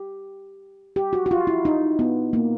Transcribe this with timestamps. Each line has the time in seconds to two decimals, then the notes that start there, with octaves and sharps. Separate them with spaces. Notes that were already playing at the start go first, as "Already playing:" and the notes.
Already playing: G4
0.96 G4
1.13 F#4
1.26 F#4
1.31 F4
1.47 E4
1.65 D#4
1.99 B3
2.33 A#3